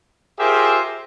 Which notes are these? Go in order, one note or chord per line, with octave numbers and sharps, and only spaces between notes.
F4 G4 G#4 A#4 C5 E5